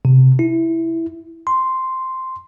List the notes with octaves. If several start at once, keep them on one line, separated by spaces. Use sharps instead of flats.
C3
E4
C6